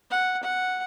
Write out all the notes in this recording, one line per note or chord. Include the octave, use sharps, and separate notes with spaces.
F#5
F#5